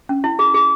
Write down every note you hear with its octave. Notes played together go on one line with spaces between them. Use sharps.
C#4
E4
G#4
G#4